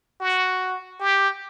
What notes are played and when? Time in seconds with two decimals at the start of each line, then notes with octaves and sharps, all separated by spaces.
0.21 F#4
1.00 G4